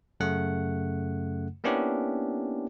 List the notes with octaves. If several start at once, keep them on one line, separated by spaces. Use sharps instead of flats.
F#2 C#3 A3 F#5
A#3 B3 C#4 D4 E4 G4